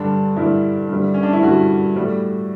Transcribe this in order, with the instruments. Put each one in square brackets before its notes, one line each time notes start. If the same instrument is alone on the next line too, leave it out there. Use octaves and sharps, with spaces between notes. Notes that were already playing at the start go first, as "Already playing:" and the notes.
Already playing: [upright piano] G2 D3 G3 D4
G2 D3 G3 E4
G2 D3 G3
C#4
D4
E4
G2 D3 G3 F#4
A2 G3